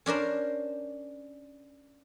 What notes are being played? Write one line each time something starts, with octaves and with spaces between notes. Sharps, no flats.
C#4 D4 A#4 C5